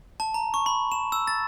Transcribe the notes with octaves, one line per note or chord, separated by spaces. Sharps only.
A5
A#5
C#6
B5
E7
E6
A6